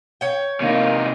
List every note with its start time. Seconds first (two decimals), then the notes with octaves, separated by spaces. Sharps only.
0.21 C#5 G5
0.61 C3 A#3 D#4